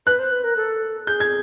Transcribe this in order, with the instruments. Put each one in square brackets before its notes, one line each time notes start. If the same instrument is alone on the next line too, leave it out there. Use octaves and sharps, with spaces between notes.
[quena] B4 [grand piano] F#6
[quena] C5
B4
A#4
A4
[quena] G#4 [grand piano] G6
[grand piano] G#6